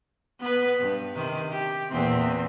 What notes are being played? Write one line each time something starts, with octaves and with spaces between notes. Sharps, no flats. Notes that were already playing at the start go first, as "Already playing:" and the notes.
B3 B4
G2
C3 D#3
G4
E2 A#2 C4